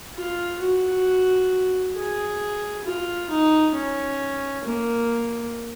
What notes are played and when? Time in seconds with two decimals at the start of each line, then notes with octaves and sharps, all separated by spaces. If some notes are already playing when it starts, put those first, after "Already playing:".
0.17 F4
0.61 F#4
1.96 G#4
2.85 F4
3.30 D#4
3.75 C#4
4.65 A#3